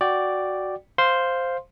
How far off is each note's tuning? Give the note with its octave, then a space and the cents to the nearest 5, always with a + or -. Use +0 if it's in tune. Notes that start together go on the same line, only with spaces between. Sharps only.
F#4 +0 D5 +0 G5 -10
C5 +0 F5 +0 C6 +0